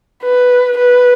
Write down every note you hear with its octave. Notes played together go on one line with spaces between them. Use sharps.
B4
B4